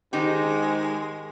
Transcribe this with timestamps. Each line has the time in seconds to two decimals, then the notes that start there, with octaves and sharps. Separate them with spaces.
0.13 G#2 D#3 G#3 D#4 G4